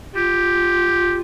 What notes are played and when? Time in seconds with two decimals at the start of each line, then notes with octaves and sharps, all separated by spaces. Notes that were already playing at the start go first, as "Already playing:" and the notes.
0.15 F4 G4